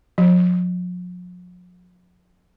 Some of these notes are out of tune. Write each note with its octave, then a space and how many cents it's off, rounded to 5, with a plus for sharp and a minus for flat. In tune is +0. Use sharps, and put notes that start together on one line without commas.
F3 +45